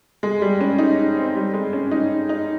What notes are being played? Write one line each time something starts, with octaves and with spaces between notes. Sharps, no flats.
G#3
G3
C#4
D#4
C4
G3
G#3
C#4
D#4
D#4